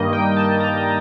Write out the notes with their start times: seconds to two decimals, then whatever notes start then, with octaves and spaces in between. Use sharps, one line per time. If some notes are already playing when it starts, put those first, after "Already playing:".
Already playing: G2 D#3 G3 A#3 D#5
0.13 G5
0.36 A5
0.60 A#5